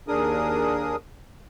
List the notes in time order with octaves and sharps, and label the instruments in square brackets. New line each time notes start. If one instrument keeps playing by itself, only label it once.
[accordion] D#2 D4 G#4 A#4 D#6